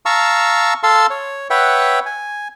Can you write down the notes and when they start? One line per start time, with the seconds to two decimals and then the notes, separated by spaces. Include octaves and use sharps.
0.06 F5 A5 A#5 C#6 E6
0.83 A4 F5 A5 C6 E6
1.10 C#5
1.50 B4 C#5 E5 F#5 G5
2.06 G#5